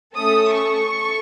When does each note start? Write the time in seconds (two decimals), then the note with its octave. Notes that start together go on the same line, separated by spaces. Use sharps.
0.15 A3 C#4 A4 D#6
0.54 C#6
0.91 A4